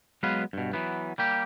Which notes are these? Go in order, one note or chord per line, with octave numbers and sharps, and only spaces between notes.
F#3 G#3 B3 B4 F5
G2 B2
E3 F#3 B3
G3 A#3 G4